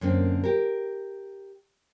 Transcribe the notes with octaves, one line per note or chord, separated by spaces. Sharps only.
F#2 D3 A#3 C4
G4 A#4